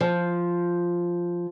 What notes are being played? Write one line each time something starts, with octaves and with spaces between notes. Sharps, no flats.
F3